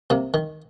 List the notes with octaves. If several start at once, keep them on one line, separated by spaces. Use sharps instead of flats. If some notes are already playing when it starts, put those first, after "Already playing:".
C3 A#3
D#3